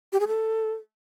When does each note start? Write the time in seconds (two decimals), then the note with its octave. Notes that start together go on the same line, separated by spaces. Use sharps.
0.13 G4
0.20 G#4
0.27 A4